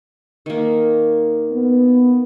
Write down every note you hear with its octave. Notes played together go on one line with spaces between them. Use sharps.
D#3 A#3
B3